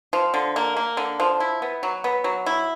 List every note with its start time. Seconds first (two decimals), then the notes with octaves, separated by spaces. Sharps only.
0.13 F3
0.34 D3
0.56 A#3
0.77 A#3
0.97 D3
1.20 F3
1.40 E4
1.62 B3
1.83 F#3
2.04 B3
2.24 F#3
2.46 E4